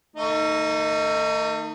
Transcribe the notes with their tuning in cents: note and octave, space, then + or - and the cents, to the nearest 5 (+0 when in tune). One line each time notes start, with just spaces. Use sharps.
D#3 +0 A3 +40 D#4 +0